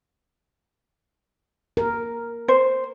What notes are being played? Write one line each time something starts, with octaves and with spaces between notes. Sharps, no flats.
A#4
C5